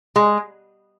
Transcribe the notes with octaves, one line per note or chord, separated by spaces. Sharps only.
G#3